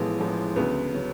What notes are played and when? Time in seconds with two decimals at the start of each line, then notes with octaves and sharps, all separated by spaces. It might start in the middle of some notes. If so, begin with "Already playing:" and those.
Already playing: A1 A2 F3 G#3 B3
0.19 A1 A2 F3 G#3
0.56 D2 C#3 F#3 B3
0.94 C#3 F#3